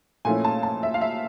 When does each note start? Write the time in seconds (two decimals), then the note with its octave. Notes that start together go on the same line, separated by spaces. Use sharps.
0.25 A#2 F3 A3 C#4 E4 G#5
0.44 A5
0.63 A5
0.83 E5
0.94 F5
1.01 E5